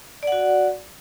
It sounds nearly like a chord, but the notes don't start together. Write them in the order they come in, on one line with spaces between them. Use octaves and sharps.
D5 F#5 F#4